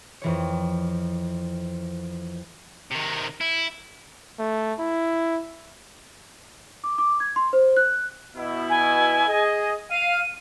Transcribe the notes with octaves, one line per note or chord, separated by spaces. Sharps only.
F2 E3 C#5
C3 D#3
E4
A3
E4
D6
D6
G#6
C6
C5
F#6
B2 E4
G#5
G#4 D#5
F5 D#7